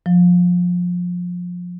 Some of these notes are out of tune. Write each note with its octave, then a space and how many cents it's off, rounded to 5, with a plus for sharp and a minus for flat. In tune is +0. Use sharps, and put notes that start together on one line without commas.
F3 +25